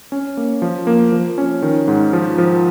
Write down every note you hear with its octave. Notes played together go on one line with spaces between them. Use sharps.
C#4
A#3
F3
A#3
F3
C#4
D#3
G#2
F3
F3